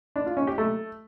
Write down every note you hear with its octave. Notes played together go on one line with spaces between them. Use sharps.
D4
F4
C#4
G4
A3